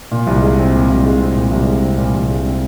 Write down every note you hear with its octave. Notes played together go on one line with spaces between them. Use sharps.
A#2
C2
G#3
C4
A#2
C2
G#3
C4
A#2
C2
G#3
C4
A#2
C2
G#3
C4